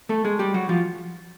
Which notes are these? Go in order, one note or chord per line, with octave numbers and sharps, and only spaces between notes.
A3 A4
G#3 G#4
G3 G4
F#3 F#4
F3 F4